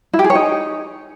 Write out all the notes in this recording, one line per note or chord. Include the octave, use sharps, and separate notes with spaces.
E4
G4
G#4
C#5
D#4